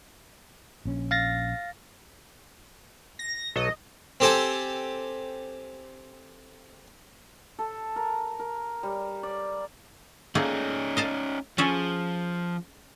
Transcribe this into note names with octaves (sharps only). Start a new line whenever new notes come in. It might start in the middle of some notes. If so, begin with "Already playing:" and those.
A#1 C#4
F5 A6 A#6
A#6
B1 F#3 A4 D#5
C4 G4 A4 C5 G#5 A5
A4
A#4
A#4
G3
D5
A3 A#3 C#4 D#4 G#4
D#5 F5 A5
F3 C#4 G#4 A4